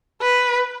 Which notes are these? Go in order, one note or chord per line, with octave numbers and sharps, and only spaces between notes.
B4